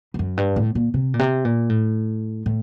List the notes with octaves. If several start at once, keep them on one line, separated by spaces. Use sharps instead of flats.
G2
F#2
G2
A2
A#2
C3
A#2
C3
A#2
A2
A2